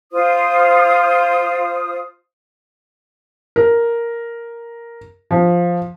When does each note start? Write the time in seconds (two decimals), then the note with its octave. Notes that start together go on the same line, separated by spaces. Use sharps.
0.12 F4 C5 D#6
3.56 A#4
5.31 F3